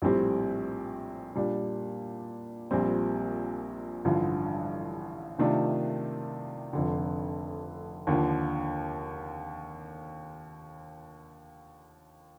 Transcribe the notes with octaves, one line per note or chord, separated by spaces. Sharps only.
A#1 A2 G3 C4 G4
A#2 G3 D4
A#1 A#2 G3 C4
A1 G2 D3 F3
C3 D#3 A3 D4 F4
F1 F2 D3
D#2 D3 F3